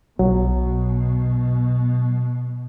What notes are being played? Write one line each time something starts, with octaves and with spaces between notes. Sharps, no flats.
B1 B2 F#3